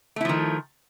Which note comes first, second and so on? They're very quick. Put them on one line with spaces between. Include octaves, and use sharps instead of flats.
A3 E4 F3 D#3